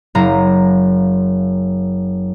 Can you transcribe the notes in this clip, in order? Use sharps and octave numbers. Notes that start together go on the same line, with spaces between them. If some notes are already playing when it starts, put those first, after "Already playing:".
F#1 F5 A#5